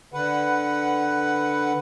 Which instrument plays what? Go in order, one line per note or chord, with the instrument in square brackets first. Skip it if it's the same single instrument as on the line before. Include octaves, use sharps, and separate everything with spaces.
[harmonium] D3 B4 F#5